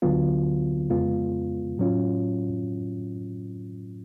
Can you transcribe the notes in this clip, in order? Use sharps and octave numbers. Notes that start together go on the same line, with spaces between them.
D2 D3 F#3 B3 F4
F2 C#3 G#3 B3 F4
A2 F#3 C#4 F4